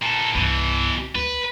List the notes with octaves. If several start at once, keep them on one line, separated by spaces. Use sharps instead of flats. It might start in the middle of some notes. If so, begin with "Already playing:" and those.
A#2 A4
C2 G2 B2 E3
D2 D3 B4